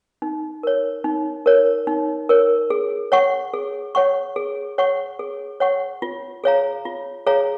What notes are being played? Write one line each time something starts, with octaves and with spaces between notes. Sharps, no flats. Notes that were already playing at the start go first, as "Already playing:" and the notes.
D#4
A#4 C#5
D#4
A#4 C#5
D#4
A#4 C#5
G#4
C#5 F#5 C#6
G#4
C#5 F#5 C#6
G#4
C#5 F#5 C#6
G#4
C#5 F#5 C#6
F4
G#4 C#5 F5 A#5
F4
G#4 C#5 F5 A#5